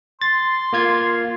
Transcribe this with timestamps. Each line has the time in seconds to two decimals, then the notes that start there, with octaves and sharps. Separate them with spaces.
0.21 C6 A6
0.73 A#3 F4 G#6